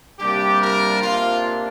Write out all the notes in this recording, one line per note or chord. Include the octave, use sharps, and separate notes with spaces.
C3 G3 A#3 D4 G4
A#4
C3 A#3 D4 F4